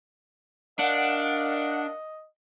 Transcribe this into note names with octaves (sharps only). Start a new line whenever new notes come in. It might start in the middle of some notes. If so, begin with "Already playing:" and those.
D4 A#4 D5 D#5 F5 F#5